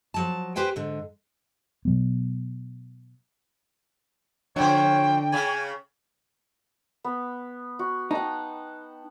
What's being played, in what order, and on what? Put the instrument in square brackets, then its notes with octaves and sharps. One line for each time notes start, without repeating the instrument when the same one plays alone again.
[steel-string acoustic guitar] F3 F#3 A5
G4 B4 C5 G5 G#5
G#2 D3
[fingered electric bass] B2 F#3 B3
[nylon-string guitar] D3 D4 [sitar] F3 C#4 C5 [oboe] C#5 [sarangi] G5
[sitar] C#3 C#4 [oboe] G#5
[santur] B3
F#4
[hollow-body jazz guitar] D#4 [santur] F#5 G5 A5